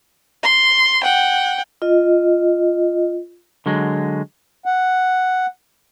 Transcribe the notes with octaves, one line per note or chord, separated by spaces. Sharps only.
C6
F#5 G5
F4 D#5
D3 F#3 G#3
F#5